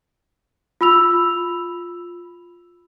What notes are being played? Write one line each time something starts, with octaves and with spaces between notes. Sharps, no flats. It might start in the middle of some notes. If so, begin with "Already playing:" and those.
F4 B5 E6 F7